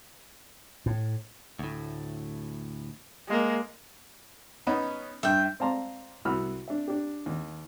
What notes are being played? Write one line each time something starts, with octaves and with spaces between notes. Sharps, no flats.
A2
D2 A2
G#3 A#3
B3 C#4 D#4
G2 E5 G5
C4 D5 F5 A5 A#5 C6
C2 F#4 B5 E6 F6
D4 E5
D4 G4
D#2